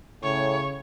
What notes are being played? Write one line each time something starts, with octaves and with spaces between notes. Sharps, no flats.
A2 C#3 C#5